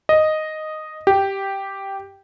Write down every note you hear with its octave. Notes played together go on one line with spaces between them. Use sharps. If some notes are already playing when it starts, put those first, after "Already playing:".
D#5
G4